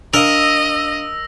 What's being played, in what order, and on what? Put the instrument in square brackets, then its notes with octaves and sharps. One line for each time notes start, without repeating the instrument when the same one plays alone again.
[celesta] D4 F5 [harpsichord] A#4 [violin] D#5 [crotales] E6 A#6